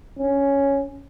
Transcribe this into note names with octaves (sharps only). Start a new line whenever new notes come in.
C#4